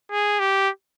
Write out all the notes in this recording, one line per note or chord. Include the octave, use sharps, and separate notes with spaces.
G#4
G4